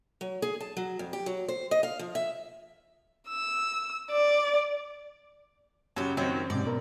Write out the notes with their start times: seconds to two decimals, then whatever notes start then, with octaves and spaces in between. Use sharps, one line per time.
0.21 F#3
0.42 G#4
0.60 A5
0.77 F#3
0.99 F2
1.13 G4
1.26 F#3
1.48 C5
1.71 D#5
1.83 F5
1.99 F3
2.15 E5
3.29 E6
4.11 D5
5.96 F#2 C#3 F#3 G4
6.17 F#2 D#3 F#3 C4 G4
6.50 G#2 C3 D5
6.65 B2 A#4